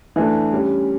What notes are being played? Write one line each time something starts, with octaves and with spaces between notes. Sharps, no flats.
E3 A3 D4
G3 C#4 G4